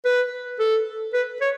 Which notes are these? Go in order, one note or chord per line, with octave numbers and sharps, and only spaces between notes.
B4
A4
B4
C#5